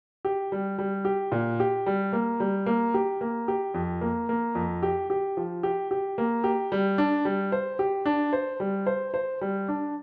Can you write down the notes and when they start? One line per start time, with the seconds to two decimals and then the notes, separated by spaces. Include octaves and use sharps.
0.25 G4
0.52 G3
0.78 G3
1.05 G4
1.32 A#2
1.60 G4
1.86 G3
2.13 A#3
2.40 G3
2.66 A#3
2.94 G4
3.21 A#3
3.48 G4
3.74 F2
4.01 A#3
4.29 A#3
4.55 F2
4.83 G4
5.10 G4
5.37 F3
5.63 G4
5.91 G4
6.18 A#3
6.44 G4
6.72 G3
6.98 D4
7.25 G3
7.52 C5
7.79 G4
8.05 D4
8.33 C5
8.60 G3
8.86 C5
9.14 C5
9.41 G3
9.68 D4